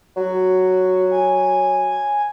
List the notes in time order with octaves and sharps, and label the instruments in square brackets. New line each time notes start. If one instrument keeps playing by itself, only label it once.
[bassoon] F#3 [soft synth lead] F#4
[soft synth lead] G#5